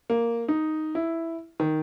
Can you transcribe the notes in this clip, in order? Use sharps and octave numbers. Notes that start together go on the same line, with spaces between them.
A#3
D#4
E4
D#3